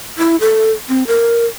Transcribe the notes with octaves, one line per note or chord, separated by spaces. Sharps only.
E4
A4
C4
A#4